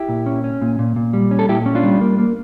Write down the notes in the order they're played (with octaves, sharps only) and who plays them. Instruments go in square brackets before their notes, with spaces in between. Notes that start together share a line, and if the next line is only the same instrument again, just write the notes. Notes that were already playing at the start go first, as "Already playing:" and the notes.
Already playing: [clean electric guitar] E4 G4
A#2
C#4
C#4
A#2
A#2
A#2
G3
C#4
A4
A#2 E4 G4
C#4
D4 F4
G3
A#3
A#3